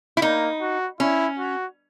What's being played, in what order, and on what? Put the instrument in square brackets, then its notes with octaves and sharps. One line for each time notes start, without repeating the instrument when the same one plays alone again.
[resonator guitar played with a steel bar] E4
[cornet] A#3 [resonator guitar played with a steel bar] D#4
[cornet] F#4
[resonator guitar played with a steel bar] C#4 [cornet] E4
[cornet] F#4